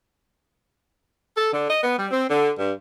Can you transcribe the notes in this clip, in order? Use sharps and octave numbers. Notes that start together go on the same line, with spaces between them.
A4
D3
D#5
B3
G3
C4
D3
G2